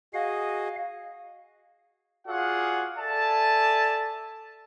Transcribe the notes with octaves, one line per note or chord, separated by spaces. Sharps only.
F#4 G#4 D#5 F5
F4 F#4 G#4 D5 F5 F#5
A4 D5 E5 G#5 A5